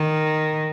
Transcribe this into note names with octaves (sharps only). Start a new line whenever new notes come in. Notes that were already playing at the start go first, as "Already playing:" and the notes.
Already playing: D#3